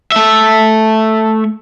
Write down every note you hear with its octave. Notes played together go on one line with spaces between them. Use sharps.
A3 E5